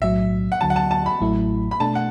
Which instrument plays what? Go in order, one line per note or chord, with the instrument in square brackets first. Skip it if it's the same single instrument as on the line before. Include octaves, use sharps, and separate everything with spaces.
[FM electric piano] B1 A2 F#3 [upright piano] E5
[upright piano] F#5
[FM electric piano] D2 D3 F#3 [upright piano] A5
[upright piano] F#5
A5
A5
B5
[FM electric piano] A1 A2 F#3 A3 E4
[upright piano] B5
[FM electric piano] B2 A3 D4 [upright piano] A5
[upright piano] F#5